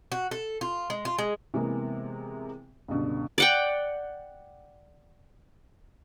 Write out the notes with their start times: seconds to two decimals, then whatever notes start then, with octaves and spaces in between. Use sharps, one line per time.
0.12 F#4
0.31 A4
0.61 F4
0.90 G#3
1.05 F4
1.18 G#3
1.54 C3 E3 G#3 A#3 B3
2.88 C#2 G2 B2 D3
3.38 D5 F#5 G5